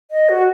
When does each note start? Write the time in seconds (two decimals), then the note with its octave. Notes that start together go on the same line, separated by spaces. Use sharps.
0.11 D#5
0.29 F#4